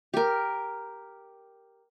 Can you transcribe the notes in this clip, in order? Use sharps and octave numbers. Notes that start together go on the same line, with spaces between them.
G4 A#4